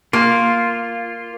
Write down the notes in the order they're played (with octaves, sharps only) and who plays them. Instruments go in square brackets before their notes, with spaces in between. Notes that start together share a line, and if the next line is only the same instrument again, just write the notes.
[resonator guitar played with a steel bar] A#3 [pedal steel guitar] F4